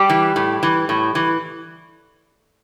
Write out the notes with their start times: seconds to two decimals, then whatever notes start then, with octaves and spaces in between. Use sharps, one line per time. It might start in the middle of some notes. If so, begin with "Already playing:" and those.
Already playing: G3 G4
0.10 E3
0.36 A2
0.63 E3
0.89 A2
1.15 E3